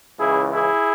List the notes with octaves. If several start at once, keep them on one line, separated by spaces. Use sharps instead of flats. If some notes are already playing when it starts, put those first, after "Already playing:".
C#2 C#3 E3 E4 G#4
E4 G#4